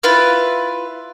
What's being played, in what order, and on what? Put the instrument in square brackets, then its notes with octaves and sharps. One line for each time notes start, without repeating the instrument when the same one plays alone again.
[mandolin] E4 F4 B4 F6